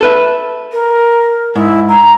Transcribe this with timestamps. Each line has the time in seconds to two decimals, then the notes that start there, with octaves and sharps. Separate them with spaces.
0.01 A4 B4 E5
0.72 A#4
1.56 G#2 E4
1.89 A#5